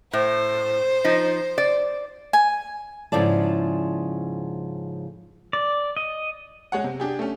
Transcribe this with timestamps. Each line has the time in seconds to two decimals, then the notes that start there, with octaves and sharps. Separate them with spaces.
0.13 A2 C5
1.04 F3 D#4
1.58 D5
2.33 G#5
3.12 G#2 C#3 F3 E4 D5 A5
5.53 D5
5.97 D#5
6.72 G#3 C#5 F#5
6.84 C3
7.00 D4 G4 G#4
7.19 A3 C#4